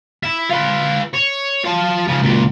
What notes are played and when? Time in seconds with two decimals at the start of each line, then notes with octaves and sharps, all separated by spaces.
0.23 E4 E5
0.49 F4 B4
1.14 C#5
1.64 F4 A5
2.08 C#3 F3
2.22 C#2 A#2